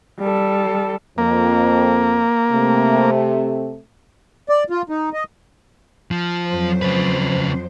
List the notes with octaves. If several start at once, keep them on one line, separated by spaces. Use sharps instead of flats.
G3 A4
F2 A#3
C3 A3
D5
F4
D#4
D#5
F3
F2 F#3 C5
C#3 B4